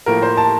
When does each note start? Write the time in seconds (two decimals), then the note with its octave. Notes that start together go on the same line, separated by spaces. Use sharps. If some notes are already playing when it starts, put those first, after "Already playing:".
0.06 A2 F3 A#3 A#4
0.22 C5
0.37 A5